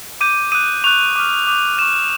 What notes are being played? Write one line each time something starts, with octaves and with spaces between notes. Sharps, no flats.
D6 G6 D#7
D#6 F#6 D#7
C#6 F#6 F7
D6 F6
D6 G6
C#6 F#6 E7